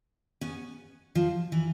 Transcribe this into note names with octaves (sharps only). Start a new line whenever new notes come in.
B3 C#4
F3
E3